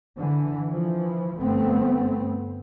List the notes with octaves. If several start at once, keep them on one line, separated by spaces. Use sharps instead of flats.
D3 E3
E3 F3
G1 A3 B3 C4